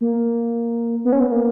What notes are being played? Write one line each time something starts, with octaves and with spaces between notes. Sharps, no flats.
A#3
B3
C#4
B3
A#3